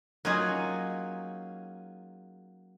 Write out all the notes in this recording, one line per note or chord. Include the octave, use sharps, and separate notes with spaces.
F#3 A#3 C#4 D#4 F4 G#4